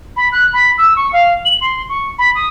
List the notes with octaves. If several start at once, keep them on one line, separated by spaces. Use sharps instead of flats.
B5
F#6
B5
E6
C#6
F5
F#7
C6
C#6
B5
D#6